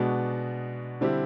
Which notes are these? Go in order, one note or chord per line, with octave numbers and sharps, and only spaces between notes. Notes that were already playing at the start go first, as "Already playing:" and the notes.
Already playing: B2 G#3 B3 D4 F#4
D3 G3 C4 E4 G4